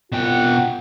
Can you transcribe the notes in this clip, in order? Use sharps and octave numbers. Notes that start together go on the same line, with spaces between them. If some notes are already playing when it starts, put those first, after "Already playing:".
C2 B2 F4 F#5 G5